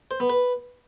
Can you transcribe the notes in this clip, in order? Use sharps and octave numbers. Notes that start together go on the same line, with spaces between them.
C5
B3
B4